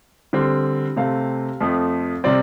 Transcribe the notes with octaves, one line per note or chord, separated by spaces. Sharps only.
D3 G3 C4
C3 A3 C4 F5
F2 F3 A3
C3 G3 C4 D5